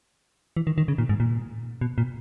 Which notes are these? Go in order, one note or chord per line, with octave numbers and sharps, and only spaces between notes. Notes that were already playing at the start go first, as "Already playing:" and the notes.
E3
D#3
D#3
C#3
A#2
G#2
A#2
B2
A#2